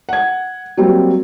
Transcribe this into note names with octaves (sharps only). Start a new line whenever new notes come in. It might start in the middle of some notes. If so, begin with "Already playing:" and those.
F#5 G#6
F#3 G3 A#3 C4